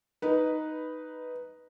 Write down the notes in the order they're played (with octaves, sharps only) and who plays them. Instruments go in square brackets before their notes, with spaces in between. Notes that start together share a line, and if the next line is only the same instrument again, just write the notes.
[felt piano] D#4 B4